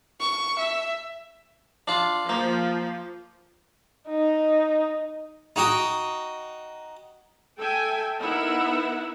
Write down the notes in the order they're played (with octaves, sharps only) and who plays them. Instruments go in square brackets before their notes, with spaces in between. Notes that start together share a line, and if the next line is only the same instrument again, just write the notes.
[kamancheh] C#6
E5
[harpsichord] D4 F4
[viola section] F3 [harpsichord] A#3
[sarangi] D#4
[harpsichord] D#4 F#4 G5 D#6
[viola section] A4 E5 G5 G#5
B3 D#4 E4 A#4 E5 F#5